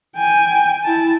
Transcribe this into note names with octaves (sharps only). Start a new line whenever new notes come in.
G5 G#5
E4 A5